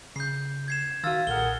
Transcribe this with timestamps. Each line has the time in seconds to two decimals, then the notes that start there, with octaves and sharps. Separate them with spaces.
0.16 C#3 G6 C7
0.68 G#6 C7 E7
1.04 D#3 F#4 E5 F5 E6 F6 A6
1.27 B1 A#2 G#4 A#4 F#5 F6 G7